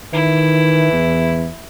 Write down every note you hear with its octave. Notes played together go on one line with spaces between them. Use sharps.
D#3 E3 E4
E2